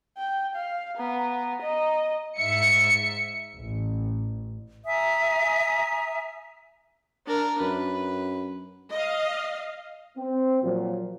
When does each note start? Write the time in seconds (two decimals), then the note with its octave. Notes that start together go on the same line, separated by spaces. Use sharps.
0.17 G5
0.55 F5
0.97 B3 A#5
1.62 D#5
2.38 G#2 E5 C#7
3.57 A1
4.85 E5 G#5 A#5 D#6
7.26 D4 A#4
7.61 F#2 B4
8.91 D#5 F5
10.17 C4
10.63 A#2 F3 F#3